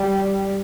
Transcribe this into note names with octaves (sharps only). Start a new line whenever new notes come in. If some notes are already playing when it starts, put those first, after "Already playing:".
Already playing: G3